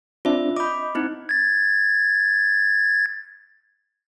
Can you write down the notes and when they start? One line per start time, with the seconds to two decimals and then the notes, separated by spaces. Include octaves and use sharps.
0.25 C4 D4 F4 E5
0.56 D#5 B5 D6 G6
0.95 C4 D#4 E4
1.29 G#6 A6